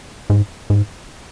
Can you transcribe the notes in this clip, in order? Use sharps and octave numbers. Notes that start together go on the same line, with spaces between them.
G#2
G#2